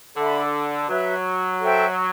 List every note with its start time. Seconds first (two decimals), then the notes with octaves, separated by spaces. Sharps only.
0.16 D3 A4 E5 B5
0.88 F#3 F#4 B4 E5
1.60 A4 C5 E5 G5